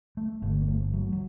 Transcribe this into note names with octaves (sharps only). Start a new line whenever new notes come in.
A3
G1 G2 D3 A3
A#3
A3
F#3
F#3